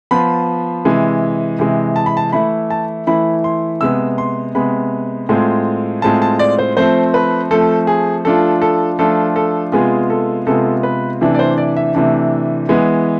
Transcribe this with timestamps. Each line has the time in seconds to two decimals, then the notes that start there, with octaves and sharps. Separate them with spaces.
0.11 F3 B3 F4 B5
0.85 C3 E3 G#3
1.59 C3 E3 G#3
1.96 A5
2.06 B5
2.17 A5
2.32 E3 A3 E4 B5
2.70 A5
3.07 E3 A3 E4 B5
3.44 C6
3.81 C3 G#3 B3 E6
4.18 C6
4.55 C3 G#3 B3 B5
5.29 A2 G#3 C4 F4
6.02 A2 G#3 C4 F4 A5
6.22 A5
6.39 D5
6.59 C5
6.77 F3 A3 C4 C5
7.14 B4
7.51 F3 A3 C4 A4
7.87 G#4
8.25 F3 A3 D4 F4 A4
8.62 A4
8.99 F3 A3 D4 F4 A4
9.36 A4
9.72 C3 G#3 B3 F4 G#4
10.10 A4
10.47 C3 G#3 B3 F4 A4
10.83 B4
11.21 C3 E3 A3 D4
11.35 D5
11.39 C5
11.58 D5
11.77 E5
11.95 C3 E3 A3 D4
12.69 E3 G#3 B3